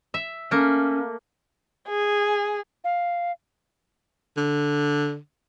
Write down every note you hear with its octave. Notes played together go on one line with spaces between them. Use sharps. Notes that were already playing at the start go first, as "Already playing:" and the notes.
E5
A3 A#3 C#4
G#4
F5
D3